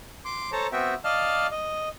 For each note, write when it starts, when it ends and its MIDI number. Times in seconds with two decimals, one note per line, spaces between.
0.25 0.51 84
0.25 0.51 86
0.52 0.67 69
0.52 0.67 72
0.52 0.67 73
0.52 0.67 81
0.52 0.67 82
0.72 0.94 59
0.72 0.94 60
0.72 0.94 66
0.72 0.94 76
0.72 0.94 79
1.04 1.47 74
1.04 1.47 75
1.04 1.47 77
1.04 1.47 81
1.04 1.47 89
1.51 1.89 75